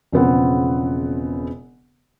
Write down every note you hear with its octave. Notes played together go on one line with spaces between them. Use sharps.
E1 C#3 F3 B3 C4 F#5